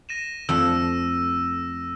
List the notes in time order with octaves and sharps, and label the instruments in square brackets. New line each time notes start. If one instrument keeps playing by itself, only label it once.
[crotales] A#6 D#7 E7
[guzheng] F2 A3 [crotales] E6